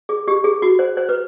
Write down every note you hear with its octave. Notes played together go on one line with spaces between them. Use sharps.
G#4
G4
G#4
F#4
C5
C5
B4